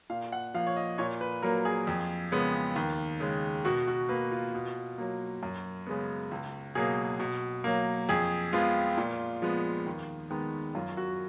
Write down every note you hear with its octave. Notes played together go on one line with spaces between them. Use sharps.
A#2 F5
F#5
F3 A#3 F5
C#5
D#5
A#2 C#5
B4
F#3 A#3 A#4
G#4
F2
C#3 G#3 B3
D#2
C#3 G#3
B2 F#4
F#4
A#3 B4
F4
B2
F#3 A#3
F#2
C#3 G#3 B3
C#2
B2 F#3 A#3 G#4
B2
F#3 A#3
F2 G#4
F3 G#3 B3 F4
A#2
F3 G#3 B3
D#2
D#3 G#3 B3
F#2 F4
F#4